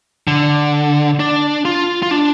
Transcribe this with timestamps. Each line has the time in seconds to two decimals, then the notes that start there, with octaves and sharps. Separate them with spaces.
0.27 D3
1.20 D4
1.65 F4
2.03 F4
2.11 D4